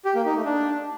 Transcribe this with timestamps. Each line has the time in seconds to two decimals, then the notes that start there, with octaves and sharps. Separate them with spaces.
0.05 G4
0.15 A#3
0.25 D#4
0.35 A3
0.45 D4